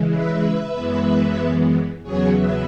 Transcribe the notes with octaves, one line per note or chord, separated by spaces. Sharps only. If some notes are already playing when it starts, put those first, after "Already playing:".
Already playing: C#3 E3 G#3
B4 E5
F#2 E3 G#3 B3
E2 C#3 F#3 B3 G#4 C#5
B4 E5